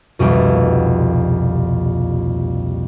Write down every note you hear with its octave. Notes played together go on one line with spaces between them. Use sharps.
D#1 C2 F2 B2